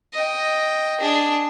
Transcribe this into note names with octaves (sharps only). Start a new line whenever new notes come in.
D#5 G5
D4 G#4